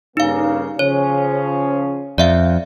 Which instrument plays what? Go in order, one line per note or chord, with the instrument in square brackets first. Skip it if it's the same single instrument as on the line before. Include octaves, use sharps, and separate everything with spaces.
[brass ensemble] G2 C#3 A#3 [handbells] D#4 F5
[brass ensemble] C#3 F3 C#4 [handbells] C#5
[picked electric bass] F2 [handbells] D5 E5 F5